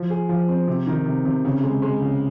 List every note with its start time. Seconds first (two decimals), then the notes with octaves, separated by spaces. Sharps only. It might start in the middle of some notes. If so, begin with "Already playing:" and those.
Already playing: F3
0.10 G#4
0.29 F3
0.49 C4
0.68 C3
0.87 D#3
1.06 C3
1.25 C3
1.45 C#3
1.63 G#3
1.82 G#3
2.02 C#3